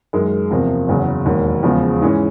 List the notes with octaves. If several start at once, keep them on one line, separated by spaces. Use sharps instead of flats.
F#2 D#3 G#3
E2 C3 F3 A#3
F#1 E2 C#3 F#3
E1 D#2 D#3
E2 C#3 F3 G#3 B3
G#2 E3 G#3 C#4